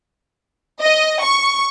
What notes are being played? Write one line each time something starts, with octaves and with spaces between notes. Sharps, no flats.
D#5
C#6